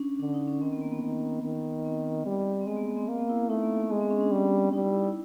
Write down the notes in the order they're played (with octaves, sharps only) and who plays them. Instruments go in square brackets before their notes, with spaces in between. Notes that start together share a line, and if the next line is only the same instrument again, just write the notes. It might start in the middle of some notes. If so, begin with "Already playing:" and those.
Already playing: [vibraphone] C#4 D4
[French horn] D3 [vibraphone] D4
[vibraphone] D#4
C#4
[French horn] D#3 [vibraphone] C4
[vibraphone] B3
A#3
B3
[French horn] D#3
D#3
[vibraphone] C4
[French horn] G3
[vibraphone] C4
[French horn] G#3 [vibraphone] B3
[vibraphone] A#3
B3
C4
[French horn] A#3 [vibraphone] C4
[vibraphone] B3
E4
E4
[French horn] A3 [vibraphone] D#4
[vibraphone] A#3
A#3
[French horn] G#3 [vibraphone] B3
[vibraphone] C4
C#4
D4
[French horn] G3
[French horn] G3 [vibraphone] D#4
[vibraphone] E4
E4
E4